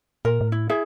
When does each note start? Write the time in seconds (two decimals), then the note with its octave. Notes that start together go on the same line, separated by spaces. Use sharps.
0.25 A#2 A#4
0.41 A2
0.52 E4
0.69 E4 G#4 E5